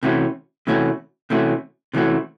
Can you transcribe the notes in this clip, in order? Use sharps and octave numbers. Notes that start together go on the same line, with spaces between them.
C3 E3 A3 C#4 F#4
C3 E3 A3 C#4 F#4
C3 E3 A3 C#4 F#4
C3 E3 A3 C#4 F#4